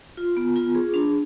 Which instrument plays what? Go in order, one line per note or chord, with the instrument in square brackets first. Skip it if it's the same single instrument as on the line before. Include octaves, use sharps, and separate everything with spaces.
[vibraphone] F4
B3
F4
G#4
D4